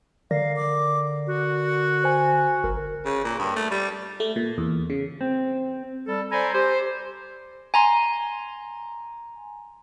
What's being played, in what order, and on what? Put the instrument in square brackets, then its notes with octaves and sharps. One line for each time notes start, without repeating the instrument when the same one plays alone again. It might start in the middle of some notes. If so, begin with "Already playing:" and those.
[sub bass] D3 [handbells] A#4 D5 A#6 [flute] F5
[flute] D6
F#4
[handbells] C5 G#5
[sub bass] G1 [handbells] A#4
[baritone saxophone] C#3
A#2
G2
A3
G3
[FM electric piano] A3
A#2
E2
C#3
[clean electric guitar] C4
[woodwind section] G3 A4
A4 C5 D5 G#5 A#5 B5
G4 C5
[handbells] G#5 A#5 C6